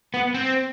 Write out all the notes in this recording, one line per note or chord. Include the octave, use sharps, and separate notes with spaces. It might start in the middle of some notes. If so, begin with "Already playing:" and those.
B3
C4